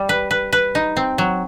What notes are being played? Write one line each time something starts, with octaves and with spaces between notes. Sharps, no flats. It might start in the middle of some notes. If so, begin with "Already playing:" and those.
Already playing: G3
B4
B4
B4
D#4
C4
F#3